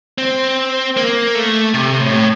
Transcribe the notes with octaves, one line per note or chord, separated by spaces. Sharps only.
C4
A#3
A3
C3
A2